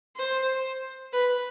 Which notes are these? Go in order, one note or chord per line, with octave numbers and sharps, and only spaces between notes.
C5
B4